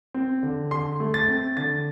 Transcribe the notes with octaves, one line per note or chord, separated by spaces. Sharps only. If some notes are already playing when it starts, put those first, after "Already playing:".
C4
D3
D3 C6
A3
A6
C4
D3 A6